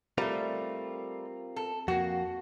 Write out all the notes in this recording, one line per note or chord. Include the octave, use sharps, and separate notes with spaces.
G3 A3 C4 F4 A#4
A4
F2 A#3 F#4